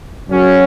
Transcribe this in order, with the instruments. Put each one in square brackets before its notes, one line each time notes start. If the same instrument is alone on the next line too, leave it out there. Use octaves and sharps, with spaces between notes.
[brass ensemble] F#2 C#3 F#3 C#4 F#4